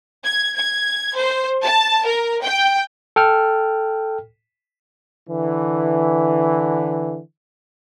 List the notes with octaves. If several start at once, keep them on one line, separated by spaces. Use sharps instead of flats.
G#6
G#6
C5
A5
A#4
G5
A4 G5 F6
D3 E3